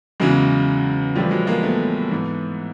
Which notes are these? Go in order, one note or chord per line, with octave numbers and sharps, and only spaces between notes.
E2 C#3 E3 F#3 G#3
A2 E3 F3 G3
F#3 G#3
G#3 A#3
A3 B3
G#2 E3